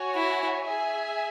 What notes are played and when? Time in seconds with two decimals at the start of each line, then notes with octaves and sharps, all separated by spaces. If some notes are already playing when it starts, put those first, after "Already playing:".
Already playing: F#4 C#5 G#5
0.15 E4
0.65 G#4 E5 G#5